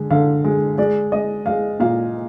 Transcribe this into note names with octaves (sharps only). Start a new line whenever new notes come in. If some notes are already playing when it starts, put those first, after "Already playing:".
Already playing: D3 G#3
D3 F5
G#3
G#3 D5
G#3 D#5
G#3 F5
A#2 F5